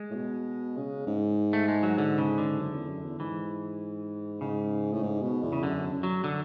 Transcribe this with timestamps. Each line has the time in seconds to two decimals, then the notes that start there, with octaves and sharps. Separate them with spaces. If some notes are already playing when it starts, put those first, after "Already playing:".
Already playing: G#3
0.10 A2
0.16 B2
0.77 C#3
1.07 G#2
1.53 A3
1.68 G#3
1.83 F#3
1.98 D3
2.18 C#3
2.38 D3
2.59 F#2
2.74 E2
2.89 F#2
3.04 E2
3.20 G#2 E3
4.41 G#2 C#3
4.93 A2
5.02 G#2
5.23 B2
5.43 E2
5.53 C#3
5.63 F#2 D3
5.93 F#2
6.03 F#3
6.24 D3